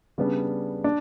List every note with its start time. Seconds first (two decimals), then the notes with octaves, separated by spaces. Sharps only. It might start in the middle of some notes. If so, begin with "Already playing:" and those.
0.18 C#3 G3 B3 D4
0.84 D4